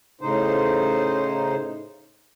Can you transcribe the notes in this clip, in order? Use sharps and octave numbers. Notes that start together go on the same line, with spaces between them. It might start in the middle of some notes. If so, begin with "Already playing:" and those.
A2 C#3 D#4 C5